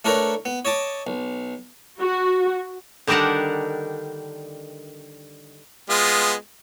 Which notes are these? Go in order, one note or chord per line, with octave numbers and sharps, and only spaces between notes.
A3 D4 A#4 B4 C#5 A#5
B3
C#5 D#5 A5 D6
B1
F#4
D3 D#3 G3 D4 A#4 F#5
G#3 B3 F4